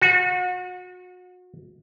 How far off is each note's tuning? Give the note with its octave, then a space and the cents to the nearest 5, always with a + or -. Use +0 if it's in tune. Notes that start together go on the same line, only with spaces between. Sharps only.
F#4 -30